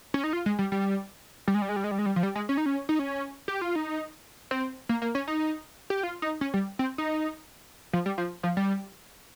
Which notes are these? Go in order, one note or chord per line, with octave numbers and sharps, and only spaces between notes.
C#4
D#4
F4
G#3
G3
G3
G3
G#3
G3
G#3
G3
G#3
G3
G#3
G3
F3
G3
G#3
C#4
D#4
C#4
D#4
C#4
G4
F4
D#4
C4
A#3
A#3
C#4
D#4
G4
F4
D#4
C#4
G3
C4
D#4
F3
G3
F3
F3
G3